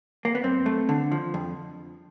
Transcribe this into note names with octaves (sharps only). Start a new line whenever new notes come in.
A#3
B3
F#2 C4
A3
D3
F3
F2